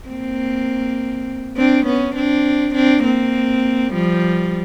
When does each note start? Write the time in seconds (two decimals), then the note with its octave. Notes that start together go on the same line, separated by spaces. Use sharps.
0.09 A#3 C4
1.57 C4 D4
1.86 B3 C#4
2.16 C4 D4
2.75 C4 D4
3.04 A#3 C4
3.93 F3 G3